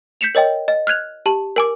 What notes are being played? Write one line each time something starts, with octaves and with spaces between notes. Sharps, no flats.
G6 B6 C#7 E7 F7
A#4 C#5 D#5 G5
D#5
F6 F#6 G#6 F7
G4 A5 F#7
A#4 G#5 D6